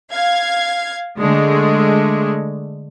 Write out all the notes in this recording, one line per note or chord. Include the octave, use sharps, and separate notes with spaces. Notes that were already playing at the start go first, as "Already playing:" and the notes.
F5 G#6
D3 G#3 A3